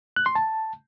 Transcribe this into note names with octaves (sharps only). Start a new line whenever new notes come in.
F#6
C6
A5